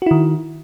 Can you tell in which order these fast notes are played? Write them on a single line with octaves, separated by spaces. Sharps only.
F#4 E4 D#3